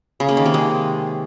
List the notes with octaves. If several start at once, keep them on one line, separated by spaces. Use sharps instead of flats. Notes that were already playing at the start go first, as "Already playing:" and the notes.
C#3
A#3
D#3
C3
G#3